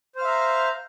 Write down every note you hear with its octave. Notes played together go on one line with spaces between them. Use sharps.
C5 E5 F5 A#5 F6